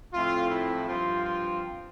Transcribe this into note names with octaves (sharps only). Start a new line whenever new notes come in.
A2 F3 A3 C4 F4
E4
G2 F3 C4 F4
F4